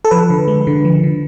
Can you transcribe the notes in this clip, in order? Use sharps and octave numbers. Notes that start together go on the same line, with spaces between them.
A4
F3 B4
D3
G#3
D3
F3
D3